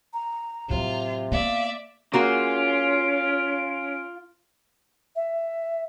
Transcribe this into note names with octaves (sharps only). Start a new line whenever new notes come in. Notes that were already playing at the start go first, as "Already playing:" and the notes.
A#5
A2 C3 F#3 F4
A#3 B3 D5 E5 F5
A#3 C#4 F4 F#4 G#4 F5 D7
E5